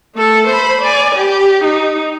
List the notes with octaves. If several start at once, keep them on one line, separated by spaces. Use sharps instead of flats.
A3 A4
C5 B5
D5 G#5
G4
D#4